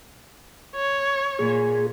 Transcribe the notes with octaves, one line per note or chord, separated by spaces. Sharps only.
C#5
A#2 G#4